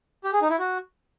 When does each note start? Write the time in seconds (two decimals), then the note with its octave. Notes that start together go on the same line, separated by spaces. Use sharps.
0.24 G4
0.33 G#4
0.42 D#4
0.50 E4
0.59 F#4